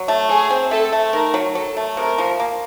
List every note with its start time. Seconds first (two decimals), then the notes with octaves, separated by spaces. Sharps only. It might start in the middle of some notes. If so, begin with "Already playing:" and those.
Already playing: F#3
0.08 A3
0.29 F#3 G#4
0.50 C4
0.71 A3 A4
0.92 A3
1.13 D#3 A#4
1.34 F#3
1.55 F#3 A4
1.77 A3
1.97 C3 A#4
2.18 F3
2.40 A#3